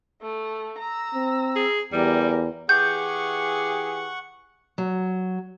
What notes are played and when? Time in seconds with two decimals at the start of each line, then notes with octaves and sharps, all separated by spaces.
0.22 A3
0.78 A#5 E6
1.14 C4
1.56 G#4
1.92 E2 G3 G4 A#4
2.69 E3 G4 G#4 F#5 C#6 G6
4.78 F#3